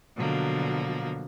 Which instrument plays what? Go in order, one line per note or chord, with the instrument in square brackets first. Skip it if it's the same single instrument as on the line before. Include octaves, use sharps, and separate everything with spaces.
[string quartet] B2 D3 F3 F#3 A#3